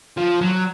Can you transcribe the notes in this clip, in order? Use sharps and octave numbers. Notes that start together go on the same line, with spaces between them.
F3
F#3